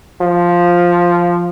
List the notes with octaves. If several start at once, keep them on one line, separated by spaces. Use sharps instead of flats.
F3